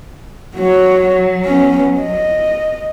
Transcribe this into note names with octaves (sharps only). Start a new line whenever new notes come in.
F#3 F#4 C#5
B3 C#4
D#5